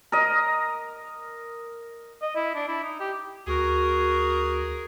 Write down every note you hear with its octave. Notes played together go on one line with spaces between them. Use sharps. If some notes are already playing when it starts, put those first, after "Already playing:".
A#4 D#5
D#5
E4
D4
E4
D#4
G4
D2 F#4 G#4 A#4